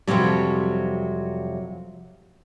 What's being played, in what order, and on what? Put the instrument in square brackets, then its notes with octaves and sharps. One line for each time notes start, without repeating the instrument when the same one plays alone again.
[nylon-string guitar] F2 A2 C3 F#3 G3